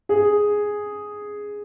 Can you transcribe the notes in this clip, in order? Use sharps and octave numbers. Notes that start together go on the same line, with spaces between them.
G#4